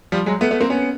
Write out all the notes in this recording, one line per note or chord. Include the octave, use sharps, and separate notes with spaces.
F3 G3
F#3 G#3
A3 B3
A3 B3
A#3 C4
B3 C#4